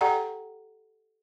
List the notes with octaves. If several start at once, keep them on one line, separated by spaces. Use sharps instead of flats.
G4 A4 D5 F#5 G5 A#5